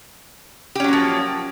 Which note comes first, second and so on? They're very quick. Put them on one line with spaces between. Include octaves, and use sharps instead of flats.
G4 C#4 F#3 A#3 F3